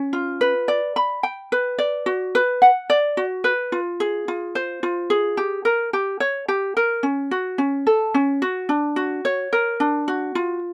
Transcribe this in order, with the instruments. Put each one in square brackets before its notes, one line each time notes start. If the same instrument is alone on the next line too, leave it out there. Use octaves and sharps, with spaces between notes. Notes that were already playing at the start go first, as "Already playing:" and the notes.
Already playing: [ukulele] C#4
F4
B4
D5
B5
G5
B4
D5
F#4
B4
F#5
D5
F#4
B4
F4
G#4
F4
C5
F4
G#4
G4
A#4
G4
C#5
G4
A#4
C#4
F#4
C#4
A4
C#4
F#4
D4
F#4
C#5
A#4
D4
F#4
F4